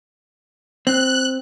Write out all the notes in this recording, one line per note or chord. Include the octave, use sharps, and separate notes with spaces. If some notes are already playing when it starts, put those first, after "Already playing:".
C4 F#6